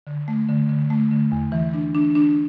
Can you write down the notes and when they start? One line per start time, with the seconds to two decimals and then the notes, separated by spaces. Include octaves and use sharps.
0.07 D3
0.28 A3
0.49 D3
0.69 D3
0.90 A3
1.11 D3
1.32 E2
1.52 E3
1.74 D4
1.95 D4
2.15 D4